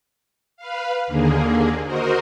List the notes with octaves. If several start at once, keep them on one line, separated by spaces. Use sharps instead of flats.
B4 F5
D#2 D3 A#3 G#4
F#4 A#4 C5 D#5